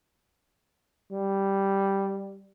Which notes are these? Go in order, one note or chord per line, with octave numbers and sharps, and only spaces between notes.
G3